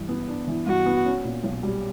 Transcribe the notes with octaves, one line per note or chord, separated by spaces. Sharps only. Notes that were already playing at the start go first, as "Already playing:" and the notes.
Already playing: G2 E3
B3
D4
E3
G2 F#4
B3
C#4
A#2
B1
G3